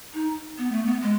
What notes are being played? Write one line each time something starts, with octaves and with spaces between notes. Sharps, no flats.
D#4
B3
A3
B3
G#3